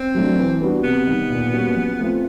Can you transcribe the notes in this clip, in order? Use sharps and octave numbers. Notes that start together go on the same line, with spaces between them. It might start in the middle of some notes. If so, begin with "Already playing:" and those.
Already playing: C4
F#3 A3 D4
E3
G3 B3 D4 F#4
C3 B3
D#3 G3
A#2
G3 A#3 C#4 F#4
F3
A3 C4 F4